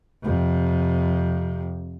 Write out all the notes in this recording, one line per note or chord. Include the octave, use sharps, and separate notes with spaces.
F2 C3